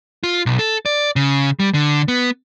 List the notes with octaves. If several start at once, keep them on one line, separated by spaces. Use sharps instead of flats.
F4
B1
A4
D5
C#3
G3
D3
B3